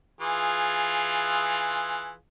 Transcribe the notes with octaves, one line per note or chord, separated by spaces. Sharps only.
E3 F4 G#4